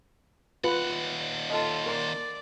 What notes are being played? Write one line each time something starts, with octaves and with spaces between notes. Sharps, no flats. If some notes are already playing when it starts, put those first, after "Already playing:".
D#2 F4 B4 F#5
F4 A4 D#5
A#4 D5 C6